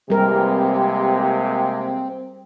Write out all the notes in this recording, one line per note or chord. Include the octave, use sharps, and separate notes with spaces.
C3 E3 G3 G#3 A#3 C4 G4 A#4